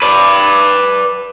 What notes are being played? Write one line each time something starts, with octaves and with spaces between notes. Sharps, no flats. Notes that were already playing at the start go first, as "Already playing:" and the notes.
B4 D5